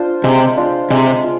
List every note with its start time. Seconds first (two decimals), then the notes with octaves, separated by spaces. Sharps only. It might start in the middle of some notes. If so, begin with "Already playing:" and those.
Already playing: D4 F4 C5
0.24 C3 G#3
0.57 D4 F4 C5
0.90 C3 G#3
1.24 F4